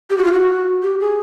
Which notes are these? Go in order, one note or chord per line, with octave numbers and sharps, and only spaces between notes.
G4
F#4
F4
F#4
G4
G#4